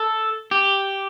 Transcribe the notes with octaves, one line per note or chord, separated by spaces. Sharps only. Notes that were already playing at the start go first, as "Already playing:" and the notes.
Already playing: A4
G4